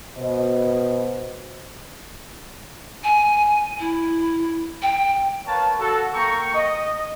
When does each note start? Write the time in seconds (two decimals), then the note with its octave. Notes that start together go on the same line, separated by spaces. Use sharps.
0.18 B2 C5 D#5
3.04 G#5
3.80 E4
4.82 G5
5.47 A#4 B4 C#5 F5 A5
5.80 F#4 A4
6.15 A#3 G5 A#5 C#6
6.55 D#5